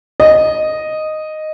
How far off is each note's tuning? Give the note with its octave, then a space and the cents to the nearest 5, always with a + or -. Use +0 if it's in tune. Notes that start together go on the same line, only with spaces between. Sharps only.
D#5 -5